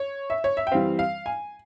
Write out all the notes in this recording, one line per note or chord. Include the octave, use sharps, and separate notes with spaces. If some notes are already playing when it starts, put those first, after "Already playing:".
Already playing: C#5
E5
C#5
E5
G5
E3 G3 C4 F5
F5
G#5